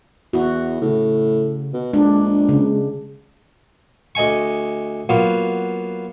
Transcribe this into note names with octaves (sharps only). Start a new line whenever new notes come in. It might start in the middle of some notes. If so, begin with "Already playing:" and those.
E2 F#4
A2 C#3
B2
A#1 G#3 D4
C#3
D2 D#5 G#5 C#6
F#3 A#3 B3 F4